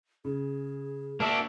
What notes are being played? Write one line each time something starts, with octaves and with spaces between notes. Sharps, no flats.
C#3 G#4
A#3 D4 F#4 E5